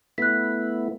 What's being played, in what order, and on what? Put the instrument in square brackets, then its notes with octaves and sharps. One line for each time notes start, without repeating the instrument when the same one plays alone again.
[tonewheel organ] A3 B3 E4 [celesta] F#6 B6